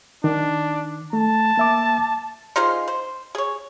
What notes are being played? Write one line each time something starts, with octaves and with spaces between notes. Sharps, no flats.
D#3 D4
A3 A5
A#3 E5 D6
D#4 F4 G#4 C5
C5
G#4 C#5